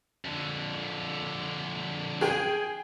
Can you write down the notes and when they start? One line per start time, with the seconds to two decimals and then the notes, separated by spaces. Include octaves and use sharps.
0.25 F2 D3
2.21 G#4 G5 G#5